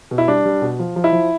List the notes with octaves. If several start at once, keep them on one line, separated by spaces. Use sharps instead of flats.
B2
E4
G3 D4
G3
B2
F3
F3
E4
F3